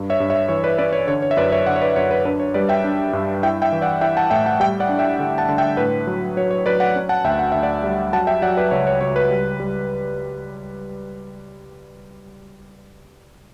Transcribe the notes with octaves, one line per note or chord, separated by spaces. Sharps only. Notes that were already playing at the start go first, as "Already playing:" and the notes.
Already playing: G2
C#5 E5
G2
C#5 E5
E3 C#5
B4 D5
C#4 B4 D5
C#5
D3 C#5
C#5
E5
F#2 B4 D5
C#5 E5
D3 D5 F#5
C#5
B4 D5
F#2 C#5
B4
D4 B4
C#5
G3 B4 D5
E5 G5
D4
G2
E4 E5 G5
E5 G5
E3
D5 F#5
E4 E5 G5
F#5 A5
A2 E5 G5
F#5 A5
G3 E5 G5
D5 F#5
D4
E5 G5
D3
F#5 A5
D3
E5 G5
A2 B4
F#3
F#3 C#5
C#5
F#3 B4 D5
D5 F#5
C#4
F#5 A5
D2 E5 G5
F#5
D2 E5
D5 F#5
G3
F#3 F#5 A5
E5 G5
F#3 D5 F#5
B4 D5
C#2 C#5
C#5
C#2 C#5
B4
G3
G3